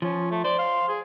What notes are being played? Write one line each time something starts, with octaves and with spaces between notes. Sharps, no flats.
F3 C#4
A3
C5 D5
F5
G#4